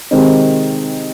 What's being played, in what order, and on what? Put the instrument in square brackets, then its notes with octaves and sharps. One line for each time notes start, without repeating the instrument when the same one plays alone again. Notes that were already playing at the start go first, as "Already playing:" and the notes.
[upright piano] C3 D#3 G#3 C4 D#4